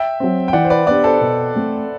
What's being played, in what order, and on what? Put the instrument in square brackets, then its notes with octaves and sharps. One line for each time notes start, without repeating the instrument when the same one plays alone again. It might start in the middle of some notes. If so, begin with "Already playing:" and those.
Already playing: [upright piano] E5 G5
[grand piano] F#3 C4
[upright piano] G5
[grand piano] E3 [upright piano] D5 F#5
[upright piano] C5
B4 D5
[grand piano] B3 D4 G4 [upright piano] B4 D5
[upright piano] A4 C5
[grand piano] B2
A3 C4